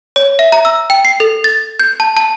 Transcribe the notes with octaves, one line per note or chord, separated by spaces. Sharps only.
C#5
E5
A#5
E6
G5
C7
A4
A6
G6
A5
A5